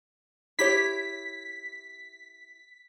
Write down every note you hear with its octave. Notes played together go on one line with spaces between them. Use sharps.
E4 G4 C#5 B6